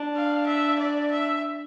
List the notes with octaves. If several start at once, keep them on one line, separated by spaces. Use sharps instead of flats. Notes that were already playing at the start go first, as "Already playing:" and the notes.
Already playing: D4
F5
E5
D5
E5